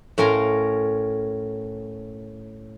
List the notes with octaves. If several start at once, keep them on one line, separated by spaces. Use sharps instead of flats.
A2 C#4 A#4 F5 C6